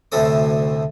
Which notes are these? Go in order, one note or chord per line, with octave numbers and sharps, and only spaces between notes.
D2 A2 C3 A3 A4 D#6